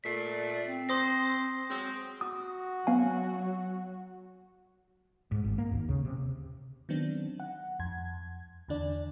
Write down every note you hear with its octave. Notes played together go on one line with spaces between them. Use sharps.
A#2 A3 D5 B6 C7
C4
C5 C6 D#6 A#6
F#3 G#3 C4
F#4 D#6
F#3 B3 F5 G#5
G#2
G#1
A#3
D#2
C#3
C3
D#3 F#3 B3 C4 D4
F#5
F2 G#6
E2 D3 D4 D5